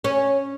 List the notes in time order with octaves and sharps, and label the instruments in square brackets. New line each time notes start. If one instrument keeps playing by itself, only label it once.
[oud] C#4